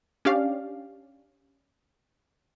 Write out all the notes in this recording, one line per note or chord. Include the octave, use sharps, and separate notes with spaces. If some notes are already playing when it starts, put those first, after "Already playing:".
C#4 D4 G4 D5 F5